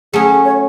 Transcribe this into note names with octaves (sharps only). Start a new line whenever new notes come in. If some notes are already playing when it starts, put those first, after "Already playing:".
F#3 A3 C#4 G#4
C#5